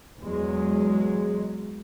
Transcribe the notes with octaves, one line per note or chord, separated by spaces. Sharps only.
E2 F#3 G#3